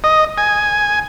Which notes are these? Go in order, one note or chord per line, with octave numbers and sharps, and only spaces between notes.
D#5
G#5